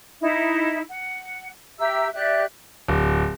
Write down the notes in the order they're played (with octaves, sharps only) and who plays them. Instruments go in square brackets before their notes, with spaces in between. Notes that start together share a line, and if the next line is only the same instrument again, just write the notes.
[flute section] D#4 E4 E5
F#5
G4 E5 A#5 E6
G4 D5 E5 F#6
[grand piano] D1